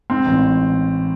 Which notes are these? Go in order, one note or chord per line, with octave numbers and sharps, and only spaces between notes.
G#2 C4
A1